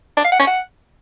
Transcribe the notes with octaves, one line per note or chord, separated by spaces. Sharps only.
D4
F5
F#5
C#4
F#5